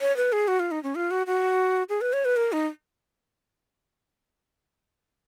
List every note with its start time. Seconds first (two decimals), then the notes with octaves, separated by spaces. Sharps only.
0.01 C#5
0.17 B4
0.32 G#4
0.48 F#4
0.60 F4
0.71 D#4
0.83 C#4
0.95 F4
1.11 F#4
1.27 F#4
1.89 G#4
2.01 B4
2.13 C#5
2.25 B4
2.36 A#4
2.52 D#4